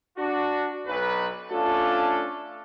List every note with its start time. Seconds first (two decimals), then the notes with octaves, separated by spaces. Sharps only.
0.18 D4 F#4
0.87 B1 B4
1.51 A3 C#4 D4 F4 A4